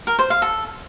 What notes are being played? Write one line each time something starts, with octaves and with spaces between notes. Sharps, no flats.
A#4
C5
F5
A4